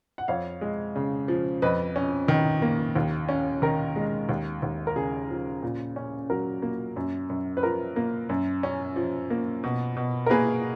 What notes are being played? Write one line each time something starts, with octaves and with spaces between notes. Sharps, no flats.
F#5
F2 C#5 F5
G#3
C#3
F3
F2 B4 D#5
C#4
D#3
A#3
D#2
C#4
D#3 A#4
G#3
D#2
D#2
A#4
C#3 G#4
F3
A#2
C#4
F#3 A#4
A#3
F#2
F#2
B4
F3 A#4
A#3
F#2
C#4
F3
A#3
B2
B2
A#4
A#3 G#4 B4